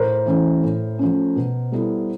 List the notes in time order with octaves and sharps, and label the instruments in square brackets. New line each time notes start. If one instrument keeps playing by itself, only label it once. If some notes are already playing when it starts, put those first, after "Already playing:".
Already playing: [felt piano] A2 [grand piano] A#4 C5
[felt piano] E3 A3 C#4 E4
A2
F3 A3 C#4
B2
G3 B3 E4 A4